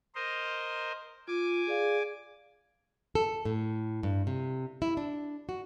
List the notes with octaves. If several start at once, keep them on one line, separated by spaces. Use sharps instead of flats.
A#4 C5 D#5
F4 G#5 D6
G#4 D5 F5
A4
A2
G2
C3
E4
D4
F#4